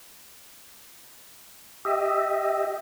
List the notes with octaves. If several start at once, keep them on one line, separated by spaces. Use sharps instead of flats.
G4 D#5 E5